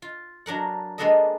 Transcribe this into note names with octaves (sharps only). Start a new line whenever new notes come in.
F4
F#3 D4 A#4 F#5
G#3 A#3 B3 D4 A4 D#5